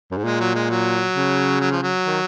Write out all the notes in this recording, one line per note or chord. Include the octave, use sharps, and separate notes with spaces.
F#2
G#2
A#2 G#3
F#3
G#3
F#3
C#3
F#3
F3
F#3
D#3